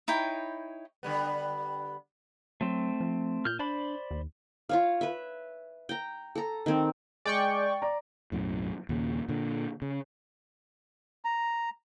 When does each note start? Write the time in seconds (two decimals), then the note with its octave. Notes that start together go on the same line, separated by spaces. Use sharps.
0.08 D#4 E4 C#5 G5
1.03 D3 G3 B3
2.61 F#3 A3 C4
3.00 F3
3.45 A#2 F6 G6
3.59 D4 C5 D5 B5
4.11 D#2
4.69 F4 C#5 F5
5.01 B4 E5
5.89 G5 A#5
6.35 A4 A#5
6.66 D#3 C4
7.26 G#3 D5 G5 C#6
7.82 D5 A#5
8.32 B1 F#2 A2
8.89 D#2 A#2 C#3
9.29 A#2 D3
9.82 C#3
11.25 A#5